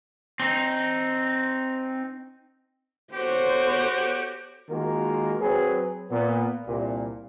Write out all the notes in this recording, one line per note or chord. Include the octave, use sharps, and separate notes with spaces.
C4 D#4
B3 F#4 G4 A4 C5 C#5
D#3 G#3 A#3 F4 F#4 A#4
F#3 C4 G#4 B4
A#2 B3
C2 A#2